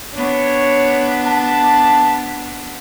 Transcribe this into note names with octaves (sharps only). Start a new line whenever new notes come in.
B3 D4 C#5
A5